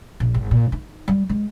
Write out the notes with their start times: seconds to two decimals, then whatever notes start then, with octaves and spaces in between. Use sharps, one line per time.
0.20 A#1
0.34 G#1
0.51 A#2
0.72 D#4
1.08 G3
1.29 G#3